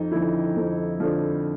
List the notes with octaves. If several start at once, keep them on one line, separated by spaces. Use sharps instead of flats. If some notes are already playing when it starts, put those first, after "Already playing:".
Already playing: F2 D#4
D3 F3 E4
F2
D3 F3